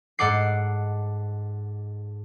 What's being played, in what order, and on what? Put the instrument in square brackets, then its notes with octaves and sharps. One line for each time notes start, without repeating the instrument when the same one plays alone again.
[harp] G#2 A4 F#5 D6 C7